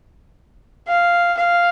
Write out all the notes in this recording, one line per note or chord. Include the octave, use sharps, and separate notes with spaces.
F5
F5